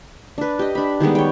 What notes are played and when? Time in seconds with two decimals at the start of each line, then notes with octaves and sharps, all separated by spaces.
0.38 D4 B4
0.59 G4 D#5
0.75 D4 B5
1.00 D#3 G3 G#3 B3
1.15 C#5 G5